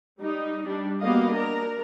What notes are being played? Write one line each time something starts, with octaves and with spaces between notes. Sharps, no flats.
G3 D#4
G3 D4
G3 A#3 B3 F#4 D#5 F5
D4 A#4 A#5